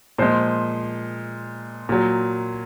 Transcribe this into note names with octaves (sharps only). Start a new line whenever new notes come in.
A#2 F3 G#3 C5
A#2 F#3